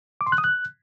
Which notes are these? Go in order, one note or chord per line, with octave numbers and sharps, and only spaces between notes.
D6
C6
F#6
D#6
F#6